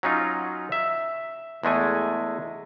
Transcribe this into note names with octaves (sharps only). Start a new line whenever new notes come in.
F#3 C#4 D#4 F4
E5
E2 G#3 A3 G#5